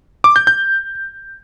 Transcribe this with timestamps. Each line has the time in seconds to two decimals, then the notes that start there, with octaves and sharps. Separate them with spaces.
0.24 D6
0.36 G6
0.47 G6